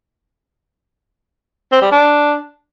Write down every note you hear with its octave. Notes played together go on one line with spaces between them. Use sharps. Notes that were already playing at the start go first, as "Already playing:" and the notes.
C4
G3
D4